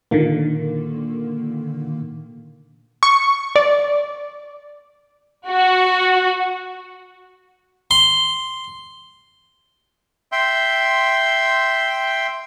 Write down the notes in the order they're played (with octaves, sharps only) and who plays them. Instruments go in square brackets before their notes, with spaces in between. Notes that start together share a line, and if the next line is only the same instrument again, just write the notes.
[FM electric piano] A#2 D3 D#3 A#3
[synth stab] C#6
D5
[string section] F#4
[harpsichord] C6
[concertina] E5 G5 C6